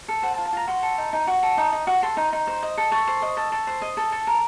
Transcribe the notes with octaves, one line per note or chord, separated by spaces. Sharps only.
A4
C5 F#5
A5
F4
A5
F4 A#5
F#4 C6
A4
D#4
D#4
F#4
A4
D#4 D#6
D#4
F#4
A4 C6
D#4
D#4
C5
D#5
A4
A4 C#6
C5
D#5
A4
A4
C5
D#5
A4
A4
A#4